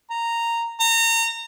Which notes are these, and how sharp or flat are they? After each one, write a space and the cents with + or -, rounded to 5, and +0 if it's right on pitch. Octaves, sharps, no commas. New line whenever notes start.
A#5 -10
A#5 -30